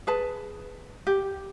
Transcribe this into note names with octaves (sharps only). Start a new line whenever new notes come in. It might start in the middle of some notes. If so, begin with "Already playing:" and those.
G#4 B4 A5
G4